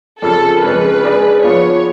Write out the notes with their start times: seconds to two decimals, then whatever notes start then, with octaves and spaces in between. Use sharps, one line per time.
0.22 F2 C#3 F3 A4
0.62 F2 C#3 G#3 B4
1.03 G#3 D4 G#4 D5
1.43 F3 B3 F4 C#5